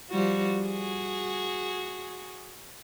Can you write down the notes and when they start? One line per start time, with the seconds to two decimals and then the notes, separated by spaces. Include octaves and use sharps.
0.10 F3 G3 F#4
0.59 F#4 G#4